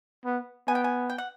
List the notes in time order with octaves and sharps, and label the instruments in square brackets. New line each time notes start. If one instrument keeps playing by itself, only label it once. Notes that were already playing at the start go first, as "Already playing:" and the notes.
[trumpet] B3
[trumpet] B3 [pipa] G#5
[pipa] G5
G#5
G5
F#5